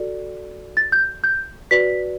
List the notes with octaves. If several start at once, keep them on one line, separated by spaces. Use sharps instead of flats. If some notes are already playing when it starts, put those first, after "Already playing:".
Already playing: F#4 A4 D5
A6
G6
G6
F#4 B4 D5 B6